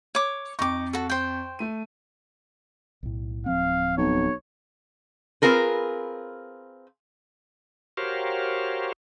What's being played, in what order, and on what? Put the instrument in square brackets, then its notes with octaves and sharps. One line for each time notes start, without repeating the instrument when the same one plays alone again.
[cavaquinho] C#5 D6
[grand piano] F2 C#6 [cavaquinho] D#4 D6
[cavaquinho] F#4 A4
C5 G5
[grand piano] A3 D#7
[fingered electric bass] B1 A2
[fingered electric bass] D1 F3 C4 [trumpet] F5
[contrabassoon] B1 [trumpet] C#5
[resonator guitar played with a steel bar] C4 F4 G#4 A#4 B4
[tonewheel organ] F#4 G4 A#4 C5 C#5 F5